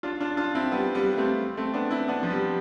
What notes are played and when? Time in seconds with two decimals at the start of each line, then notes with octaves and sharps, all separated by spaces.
0.03 D4 F4
0.20 D4 F4
0.37 D4 F4
0.55 C4 E4
0.72 G3 B3
0.95 G3 B3
1.17 A3 C4
1.57 A3 C4
1.74 B3 D4
1.91 C4 E4
2.08 B3 D4
2.23 F3
2.30 G3